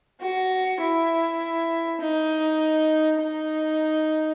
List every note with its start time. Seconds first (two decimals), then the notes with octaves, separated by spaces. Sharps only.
0.21 F#4
0.81 E4
2.01 D#4
3.20 D#4